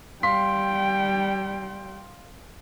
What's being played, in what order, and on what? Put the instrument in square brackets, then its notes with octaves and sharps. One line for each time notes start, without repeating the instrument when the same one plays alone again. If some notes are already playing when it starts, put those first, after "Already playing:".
[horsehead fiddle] G3 G5 [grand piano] F5 C6 B6